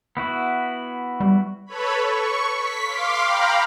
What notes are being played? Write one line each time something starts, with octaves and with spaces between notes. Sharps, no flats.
B3 E4 F#4
G3
A4 B4 C#5 B5
C#6
B6
F5 C6 D6
F5 G5 A#5 B5